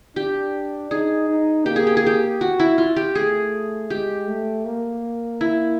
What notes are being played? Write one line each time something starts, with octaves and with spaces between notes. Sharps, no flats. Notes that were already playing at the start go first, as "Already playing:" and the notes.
D4 G4
D#4 G#4
D#4
A#3 G4
G#4
G4
G#4
G4
F#4
E4
F4
G4
A3 G#4
G#3 G4
A3
A#3
E4